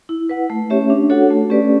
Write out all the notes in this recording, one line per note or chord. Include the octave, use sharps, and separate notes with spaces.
E4
B4 F#5
A3
C#4 G4 C#5 E5
D4
F#4 A4 C#5 F#5
A3
C#4 G4 B4 D5